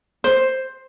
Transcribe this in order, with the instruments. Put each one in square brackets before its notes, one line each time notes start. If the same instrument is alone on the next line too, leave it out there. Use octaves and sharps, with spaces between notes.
[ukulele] C5